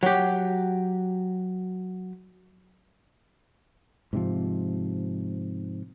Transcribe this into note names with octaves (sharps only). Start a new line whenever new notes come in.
F#3 G4
G#2 C3 F3